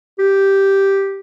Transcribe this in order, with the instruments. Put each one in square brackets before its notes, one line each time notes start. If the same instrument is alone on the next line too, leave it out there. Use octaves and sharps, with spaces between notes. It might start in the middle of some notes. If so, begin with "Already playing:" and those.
[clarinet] G4